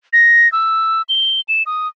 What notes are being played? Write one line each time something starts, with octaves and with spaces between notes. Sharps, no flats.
A#6
E6
G7
E7
D#6